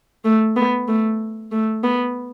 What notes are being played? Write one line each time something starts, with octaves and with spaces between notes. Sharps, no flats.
A3
B3
A3
A3
B3